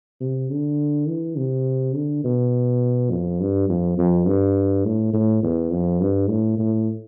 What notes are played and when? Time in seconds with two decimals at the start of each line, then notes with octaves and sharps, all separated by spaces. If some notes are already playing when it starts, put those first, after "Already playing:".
0.21 C3
0.50 D3
1.08 E3
1.37 C3
1.95 D3
2.24 B2
3.11 F2
3.40 G2
3.69 F2
3.98 F2
4.27 G2
4.85 A2
5.13 A2
5.43 E2
5.71 F2
6.01 G2
6.29 A2
6.58 A2